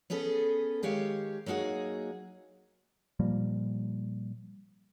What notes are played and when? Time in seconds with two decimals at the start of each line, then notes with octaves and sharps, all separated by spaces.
0.10 B3 C#4 G#4 A4 B4
0.83 D#3 G#3 G4 C#5 F5
1.46 F#3 A#3 D#4 F#4 G#4
3.19 A#2 F3 G3 A#3